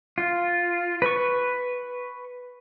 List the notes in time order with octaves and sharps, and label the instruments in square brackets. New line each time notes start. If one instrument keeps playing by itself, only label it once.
[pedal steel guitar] F4
B4 C#6